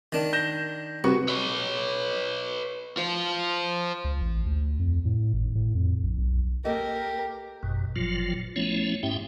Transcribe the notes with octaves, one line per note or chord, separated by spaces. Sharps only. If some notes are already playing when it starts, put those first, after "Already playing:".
D#3 D4
G6 A#6 E7
C2 F#4 B4 C#6
B4 C#5
F4 C5
C#2
A1
D2
F2
A2
G#1
A2
F2
A#1
B1
A#3 G4 A4 A#4 D#5
G#1 F#2 B2
G1 A#2 F3 F#3 F4
F3 A3 B3 C#4 E4 C#5
G#2 C#4 E4 G4 E5 G5